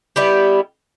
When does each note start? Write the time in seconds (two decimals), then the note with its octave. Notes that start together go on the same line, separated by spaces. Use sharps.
0.16 G3 B3 E4 G4